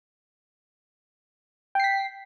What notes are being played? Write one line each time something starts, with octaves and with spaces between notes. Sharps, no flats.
G5 B6 C7